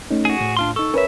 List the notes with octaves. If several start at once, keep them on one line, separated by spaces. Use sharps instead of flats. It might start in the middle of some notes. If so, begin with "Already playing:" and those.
A3 C#4 D#4
F#4 G#4
A2
D4 F4 C6
D#4 A4 C#6
C#4 A#4 B4 C#5 E5